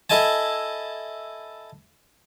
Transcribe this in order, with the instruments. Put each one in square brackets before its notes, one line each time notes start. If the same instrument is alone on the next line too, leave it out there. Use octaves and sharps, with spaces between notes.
[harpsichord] E4 A4 D#5 G#5 A5